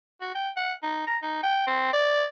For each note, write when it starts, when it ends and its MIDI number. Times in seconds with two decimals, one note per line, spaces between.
0.21 0.32 66
0.35 0.49 79
0.56 0.73 78
0.83 1.05 63
1.07 1.18 82
1.23 1.38 63
1.43 1.64 79
1.67 1.89 60
1.93 2.25 74